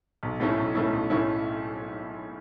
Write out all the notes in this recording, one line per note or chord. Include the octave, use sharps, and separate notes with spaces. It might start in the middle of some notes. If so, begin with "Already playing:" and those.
B1
A2 A3 C#4 E4
B1
A2 A3 C#4 E4
B1
A2 A3 C#4 E4